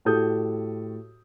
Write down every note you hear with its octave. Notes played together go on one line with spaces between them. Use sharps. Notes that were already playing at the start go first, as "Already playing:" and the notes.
A2 F#4 G4 A4 D#6 G6